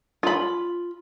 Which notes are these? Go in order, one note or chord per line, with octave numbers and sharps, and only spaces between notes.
F4 B5